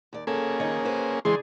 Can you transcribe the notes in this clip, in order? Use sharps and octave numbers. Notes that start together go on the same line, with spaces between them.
D#2 D5
A#3 C#4 G#4 A4
D#3 D#4 C#5
B4 C5
C#3 E3 G#3 D4 G#4 C6